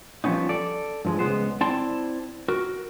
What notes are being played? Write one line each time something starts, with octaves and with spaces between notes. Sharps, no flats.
F3 G3 A#3 B3 C#4 D#4
A4 D5
G2 F3 G#3
C#2 G#2 G#3 B3 C5
C4 E4 D5 A5 C6
F#4 A#4